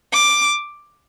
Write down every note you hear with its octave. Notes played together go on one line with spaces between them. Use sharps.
D6